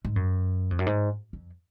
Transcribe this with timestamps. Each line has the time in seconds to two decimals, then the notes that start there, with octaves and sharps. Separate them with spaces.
0.05 G#2
0.16 F#2
0.71 F2
0.79 F#2
0.86 G#2
1.33 F2